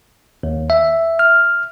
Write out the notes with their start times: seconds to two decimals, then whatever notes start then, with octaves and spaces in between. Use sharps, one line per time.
0.43 D#2
0.70 E5
1.19 F6